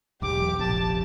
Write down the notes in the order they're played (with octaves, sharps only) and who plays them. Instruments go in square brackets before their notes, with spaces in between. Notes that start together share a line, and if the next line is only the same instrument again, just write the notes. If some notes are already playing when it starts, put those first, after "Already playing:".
[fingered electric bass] E1 B1 [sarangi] G4 [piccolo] D6
[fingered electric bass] F1 A#1 [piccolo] A5